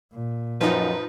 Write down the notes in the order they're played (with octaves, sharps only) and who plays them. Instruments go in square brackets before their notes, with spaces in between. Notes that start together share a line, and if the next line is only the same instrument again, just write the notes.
[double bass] A#2
[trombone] F#2 [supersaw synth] F3 D#4 [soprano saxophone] B4